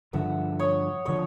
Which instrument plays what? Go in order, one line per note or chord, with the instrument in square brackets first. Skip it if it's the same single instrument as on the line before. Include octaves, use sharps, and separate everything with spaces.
[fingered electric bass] G2 D3 F3 [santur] E5 F#5
[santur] C#5 D#5
[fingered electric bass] D3 F3 [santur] C#5 D#5